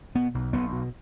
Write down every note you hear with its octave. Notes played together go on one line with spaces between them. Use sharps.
B2 B3
B1
B1 B3
B2